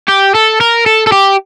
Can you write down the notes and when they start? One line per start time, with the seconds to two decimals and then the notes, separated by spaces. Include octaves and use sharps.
0.08 G4
0.35 A4
0.61 A#4
0.86 A4
1.07 A4
1.12 G4